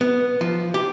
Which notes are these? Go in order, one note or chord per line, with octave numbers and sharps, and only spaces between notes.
B3
F3
G4